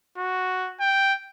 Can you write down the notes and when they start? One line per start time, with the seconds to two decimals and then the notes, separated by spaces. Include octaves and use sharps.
0.18 F#4
0.80 G5